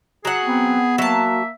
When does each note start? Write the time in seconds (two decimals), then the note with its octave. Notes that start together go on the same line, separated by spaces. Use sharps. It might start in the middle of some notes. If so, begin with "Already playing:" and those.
0.25 F#3 G#4 F#5
0.45 B3 C4
0.98 F#3 A#3 E5 A5